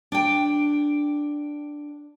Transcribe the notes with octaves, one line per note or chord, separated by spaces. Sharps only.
D4 G5